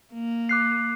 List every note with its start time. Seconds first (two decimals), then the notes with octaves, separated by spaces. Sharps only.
0.13 A#3
0.49 D6 F#6 C7